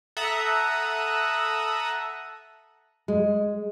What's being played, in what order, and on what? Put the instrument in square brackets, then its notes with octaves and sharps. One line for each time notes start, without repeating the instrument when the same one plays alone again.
[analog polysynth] A4 E5 F#5 A#5 D#6
[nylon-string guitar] G#3